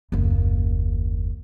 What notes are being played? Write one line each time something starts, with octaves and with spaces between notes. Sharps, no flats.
F#1 D#2